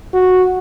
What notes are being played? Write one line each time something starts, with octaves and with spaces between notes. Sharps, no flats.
F#4